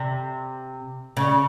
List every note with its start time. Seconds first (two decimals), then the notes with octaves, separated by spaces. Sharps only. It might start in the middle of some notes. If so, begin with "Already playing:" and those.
Already playing: C3
1.17 C#3